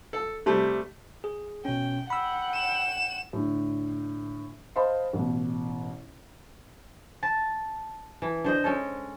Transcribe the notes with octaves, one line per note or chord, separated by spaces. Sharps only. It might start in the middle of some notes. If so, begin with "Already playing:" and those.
A4
C3 G3 A3
G#4
B2 C#4 G5
F#5 G5 B5 E6
E7
A2 D3
C5 D#5 F5 A5 B5 C6
A1 B2
A5
E3
D3 C5 D#5
G#3 C#4 A4